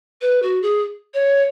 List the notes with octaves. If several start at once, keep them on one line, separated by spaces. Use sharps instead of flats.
B4
F#4
G#4
C#5